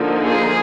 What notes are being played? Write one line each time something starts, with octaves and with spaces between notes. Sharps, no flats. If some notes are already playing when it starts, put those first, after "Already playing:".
Already playing: D3 F3 A#3 D#4
G#4